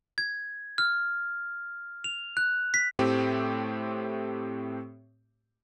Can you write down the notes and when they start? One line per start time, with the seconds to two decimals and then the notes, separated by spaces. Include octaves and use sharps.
0.18 G#6
0.78 F6
2.04 F7
2.37 F#6
2.74 B6
2.99 A2 A3 C4 G4